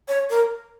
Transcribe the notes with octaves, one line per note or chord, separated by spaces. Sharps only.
C#5
A#4